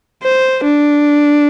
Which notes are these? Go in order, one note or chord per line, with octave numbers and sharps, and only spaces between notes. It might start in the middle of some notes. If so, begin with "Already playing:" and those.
C5
D4